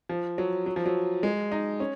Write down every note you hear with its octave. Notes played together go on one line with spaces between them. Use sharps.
F3
F#3
F#3
F3
F#3
G#3
D#4
C#4